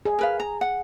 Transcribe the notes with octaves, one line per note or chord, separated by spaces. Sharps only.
G#4
A#4 B4 F5
A#5
F#5